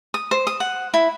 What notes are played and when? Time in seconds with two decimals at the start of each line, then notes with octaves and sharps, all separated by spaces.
0.14 D#6
0.31 C5
0.47 D#6
0.60 F#5
0.94 E4